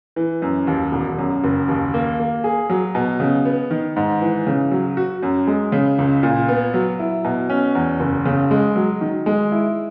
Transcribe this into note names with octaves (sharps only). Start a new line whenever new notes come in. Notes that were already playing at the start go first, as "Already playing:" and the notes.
E3
F#2
D#2
E1
F#2
F#1
D#2
A#3
A#3
G#4
F#3
B2
C#3
B3
D#3
G#2
E3
C#3
F#3
F#4
F#2
G#3
C#3
C#2
A#2
B3
F#3
E4
B2
C#4
E2
F#1
C#3
G#3
F#3
D#3
G#3
E4